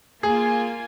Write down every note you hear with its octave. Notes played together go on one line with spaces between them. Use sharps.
A#3 F4 G#4 G#5